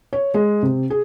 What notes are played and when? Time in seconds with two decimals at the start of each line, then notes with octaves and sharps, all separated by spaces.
0.13 C#5
0.34 G#3
0.62 C3
0.90 G#4